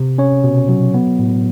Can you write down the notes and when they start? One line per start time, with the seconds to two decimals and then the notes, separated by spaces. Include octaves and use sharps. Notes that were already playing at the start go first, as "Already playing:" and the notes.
Already playing: C3
0.18 C#4 C#5
0.44 B2
0.69 F#3
0.94 B3
1.19 A2